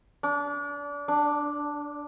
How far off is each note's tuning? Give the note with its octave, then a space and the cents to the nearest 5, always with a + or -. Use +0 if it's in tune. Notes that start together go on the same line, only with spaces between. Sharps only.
D4 -30
D4 +0